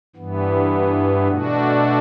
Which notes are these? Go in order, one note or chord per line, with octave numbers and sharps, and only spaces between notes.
G2 E3 B3
B2 A3 D4 F#4